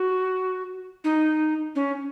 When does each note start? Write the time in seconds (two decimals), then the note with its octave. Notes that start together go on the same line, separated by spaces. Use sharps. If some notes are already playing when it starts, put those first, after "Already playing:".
Already playing: F#4
1.04 D#4
1.75 C#4